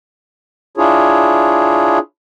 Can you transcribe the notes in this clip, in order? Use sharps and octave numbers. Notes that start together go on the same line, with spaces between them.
D4 E4 F4 G#4 C#5